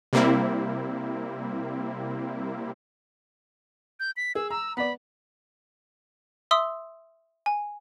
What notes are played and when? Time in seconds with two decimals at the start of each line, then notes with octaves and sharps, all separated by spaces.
0.13 C3 G3 A#3 C4 E4
4.00 G6
4.17 B6
4.35 G#4 E6
4.50 A#5 E6
4.77 B3 D5 B5
6.51 E5 C6 D#6 E6
7.46 G#5